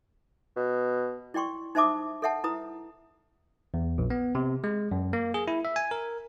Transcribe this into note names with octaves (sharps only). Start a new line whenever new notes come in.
B2
E4 D5 G5 C6 C#6
D#4 C5 E5 A5 D6 D#6
A4 C#5 E5 F#5 A5
E4 B4 A#5 D#6
E2
A#1
B3
C3
G#3
F#2
A#3
G#4
E4
E5
G#5
A#4